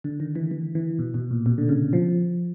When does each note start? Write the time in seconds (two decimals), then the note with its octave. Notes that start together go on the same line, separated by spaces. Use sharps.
0.04 D3
0.20 D#3
0.35 E3
0.51 E3
0.75 E3
0.99 B2
1.14 B2
1.31 A#2
1.46 B2
1.58 D3
1.69 C#3
1.93 F3